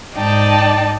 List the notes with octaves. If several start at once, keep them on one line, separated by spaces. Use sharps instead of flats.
G#2 D#4 D5 G5 A5